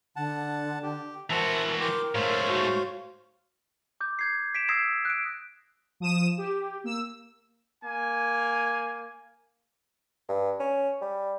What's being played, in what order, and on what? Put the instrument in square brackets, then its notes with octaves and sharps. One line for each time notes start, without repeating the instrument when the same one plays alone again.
[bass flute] D3 [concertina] F#5 A5
[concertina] G4
[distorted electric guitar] E3 F#4 [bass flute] A#4 [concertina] C5 E5 A5
[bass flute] A#4 [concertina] G5 C6 D6
[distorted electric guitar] G#2 A3 [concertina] C5 C#5 F5
[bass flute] F#4
[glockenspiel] D6 G6
G6 G#6 C7
B6 D7 E7
D#6 E6 G#6 A#6 C7 E7
F#6 D7
[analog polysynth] F3 D#6 E7
G4
A#3 E6
[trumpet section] A#3 G#5
[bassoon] G2
C#4
G3